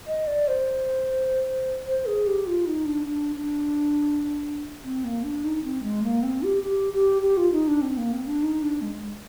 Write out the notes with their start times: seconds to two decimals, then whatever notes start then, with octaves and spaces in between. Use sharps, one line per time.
0.07 D#5
0.27 D5
0.48 C5
1.86 C5
2.06 G#4
2.27 G4
2.47 F4
2.66 D#4
2.86 D4
3.05 D4
3.35 D4
4.84 C4
5.05 A#3
5.24 D4
5.44 D#4
5.64 C4
5.83 G#3
6.03 A#3
6.23 C4
6.43 G4
6.63 G4
6.93 G4
7.22 G4
7.37 F4
7.52 D#4
7.68 D4
7.82 C4
7.97 A#3
8.13 C4
8.27 D4
8.43 D#4
8.62 D4
8.82 G#3